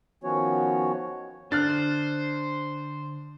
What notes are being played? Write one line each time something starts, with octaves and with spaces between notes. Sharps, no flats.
D#3 F3 B3 C#4 F#4 C#5
D3 D4 C5 F6 F#6 A6